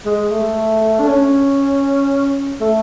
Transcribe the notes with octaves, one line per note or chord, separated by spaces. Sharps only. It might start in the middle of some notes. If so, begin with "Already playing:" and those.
G#3
A3
D4
C#4
A3